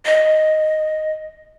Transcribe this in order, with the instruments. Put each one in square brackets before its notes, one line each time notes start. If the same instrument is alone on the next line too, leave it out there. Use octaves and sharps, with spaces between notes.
[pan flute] D#5